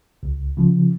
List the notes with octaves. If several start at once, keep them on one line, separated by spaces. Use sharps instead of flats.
C#2
C#3 F3